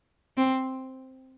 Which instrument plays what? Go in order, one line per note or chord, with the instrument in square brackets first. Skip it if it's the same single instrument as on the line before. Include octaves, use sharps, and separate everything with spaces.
[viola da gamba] C4